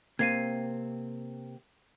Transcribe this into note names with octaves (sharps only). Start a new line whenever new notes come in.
C3 A#3 C4 G#6 C7 D#7